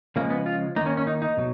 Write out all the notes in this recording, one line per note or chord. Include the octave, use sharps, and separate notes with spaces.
C#3 F3 G#3 A#3
B3
F4
D#3 A#3 D#4
C#4
C#4
D#4
D#4
B2 F#3